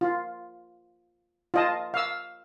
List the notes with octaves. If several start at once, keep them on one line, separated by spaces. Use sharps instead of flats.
F4
F4 D#5 A5
F5 E6